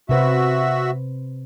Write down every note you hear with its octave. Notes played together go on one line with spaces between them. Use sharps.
C3 F#4 B4 C5 E5